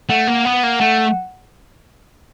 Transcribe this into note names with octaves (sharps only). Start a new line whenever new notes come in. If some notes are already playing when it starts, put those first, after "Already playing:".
A3 F#5
A#3
B3 F#5
A#3
A3 F#5